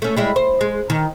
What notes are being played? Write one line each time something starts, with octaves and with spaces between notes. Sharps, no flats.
A3 C#4
G3 G#3 E4
C5
G#3
D#3